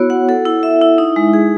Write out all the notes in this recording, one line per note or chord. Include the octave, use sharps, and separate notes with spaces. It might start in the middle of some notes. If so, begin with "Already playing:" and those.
Already playing: B3 E4 F#4 C#5
F#5
A4
E4
E5
E4
D#4
G#3
G#4